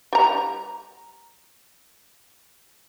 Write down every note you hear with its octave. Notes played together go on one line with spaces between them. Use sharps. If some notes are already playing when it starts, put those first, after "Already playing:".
G3 A#5